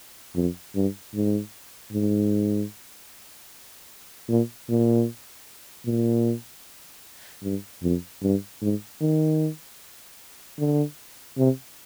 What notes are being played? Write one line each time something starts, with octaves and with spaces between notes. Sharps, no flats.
F2
G2
G#2
G#2
A#2
A#2
A#2
G2
F2
G2
G#2
D#3
D3
C3